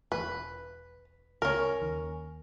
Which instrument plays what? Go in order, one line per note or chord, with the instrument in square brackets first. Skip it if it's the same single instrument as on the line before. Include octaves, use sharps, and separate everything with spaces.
[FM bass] E1 [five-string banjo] B4
[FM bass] C#2 [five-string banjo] C#4 A#4
[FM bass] D#2